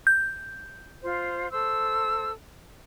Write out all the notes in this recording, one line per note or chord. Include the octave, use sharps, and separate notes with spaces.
G6
F4 C5
A4 C5 E6